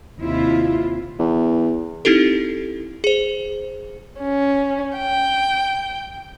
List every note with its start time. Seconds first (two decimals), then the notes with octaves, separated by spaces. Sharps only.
0.20 D#2 C3 E4 F4
1.19 E2
2.05 C4 D#4 E4 G4 A4
3.04 G#4 C5
4.19 C#4
4.97 G5